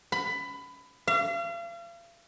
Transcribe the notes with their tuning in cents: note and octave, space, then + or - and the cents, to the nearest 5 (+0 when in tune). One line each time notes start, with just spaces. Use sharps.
B5 +20
F5 -40